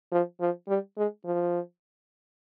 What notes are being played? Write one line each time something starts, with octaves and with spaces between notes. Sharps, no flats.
F3
F3
G3
G#3
F3